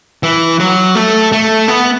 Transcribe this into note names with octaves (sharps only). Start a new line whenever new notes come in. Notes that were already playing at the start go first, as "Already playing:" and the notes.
E3
F#3
A3
A3
B3